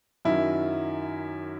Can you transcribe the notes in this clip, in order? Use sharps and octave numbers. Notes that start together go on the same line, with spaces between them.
F#2 D#3 F#3 E4